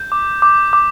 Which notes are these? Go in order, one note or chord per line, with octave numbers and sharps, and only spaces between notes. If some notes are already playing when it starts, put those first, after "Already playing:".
Already playing: G6
D6
D6
D6